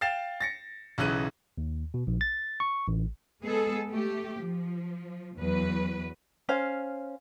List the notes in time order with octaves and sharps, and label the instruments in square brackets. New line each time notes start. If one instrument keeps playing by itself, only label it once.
[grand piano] F5 G5 A6 C7 E7
A6 A#6 C#7
B1 C#3 E3 F#6 D#7
[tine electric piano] D#2
B2
A#1
A6
C#6
A1
[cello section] G#3 B3 G#4 A4
A3 G4
F3
E2 F#3 B4
[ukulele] C#4 C5 F5